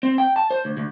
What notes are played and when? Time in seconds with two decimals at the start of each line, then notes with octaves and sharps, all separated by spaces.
0.03 C4
0.18 G5
0.36 A5
0.51 C5
0.65 D2
0.77 D2